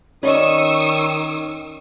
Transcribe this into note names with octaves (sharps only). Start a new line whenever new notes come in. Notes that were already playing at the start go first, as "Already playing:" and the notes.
D#3 C#4 D5 D#5 C#6 D#6 E6